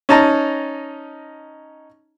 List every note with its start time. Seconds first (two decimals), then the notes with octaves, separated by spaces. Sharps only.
0.09 C#4 D#4 A5 A#5